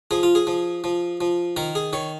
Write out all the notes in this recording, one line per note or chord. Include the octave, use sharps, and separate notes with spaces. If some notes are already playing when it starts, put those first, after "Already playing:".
F3 G#4
F4
G#4
F3
F3
F3
D#3 A#4
G#4
D#3 C#5